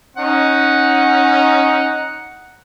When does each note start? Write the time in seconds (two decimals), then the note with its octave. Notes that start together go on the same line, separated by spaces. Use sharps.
0.17 C#4 D#4 F#5